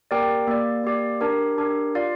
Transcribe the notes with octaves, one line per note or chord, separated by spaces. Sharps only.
A#3 G4 A#4 D5 G5
A#3 G4 D5
A#3 G4 D5
D4 G4 A#4
D4 G4 A#4
F4 D5 F5